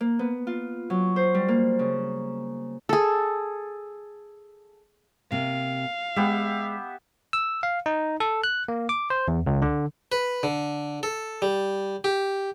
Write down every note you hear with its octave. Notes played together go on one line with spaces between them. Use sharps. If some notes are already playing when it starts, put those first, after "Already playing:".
A#3
B3
F4
F#3
C5
G3
A#3
C#3
G#4 A4
C3 A#3 F5
G#3 B3 G4 E5
E6
F5
D#4
A4
F#6
A#3
D6
C5
E2
C#2
D3
B4
D3
A4
G3
G4